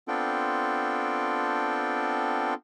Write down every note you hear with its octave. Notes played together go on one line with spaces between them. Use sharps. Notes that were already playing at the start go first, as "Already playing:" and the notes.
B3 C4 D4 F4 A4 G5